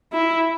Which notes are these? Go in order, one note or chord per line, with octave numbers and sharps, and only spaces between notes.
E4